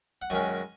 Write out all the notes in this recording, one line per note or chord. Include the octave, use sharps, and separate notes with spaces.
F#5
F#2 D#3 G#3 C#4 G#5